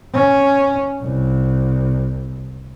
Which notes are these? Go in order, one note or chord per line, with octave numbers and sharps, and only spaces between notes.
C#4
C2